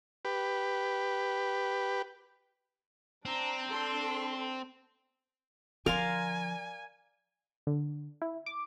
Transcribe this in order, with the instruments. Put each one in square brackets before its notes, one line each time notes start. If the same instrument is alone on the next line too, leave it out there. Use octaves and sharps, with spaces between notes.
[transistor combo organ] G4 B4
[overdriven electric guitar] C4 [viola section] D4 A#5
[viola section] D4 A4 C6
[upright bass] D3 F3 [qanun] A#4 [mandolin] D5 F5 C6 [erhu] G#5
[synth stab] D3
E4
D6